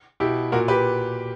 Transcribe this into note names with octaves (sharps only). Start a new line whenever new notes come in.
B2 E4 G4
A#2 F#4 A#4
G4 B4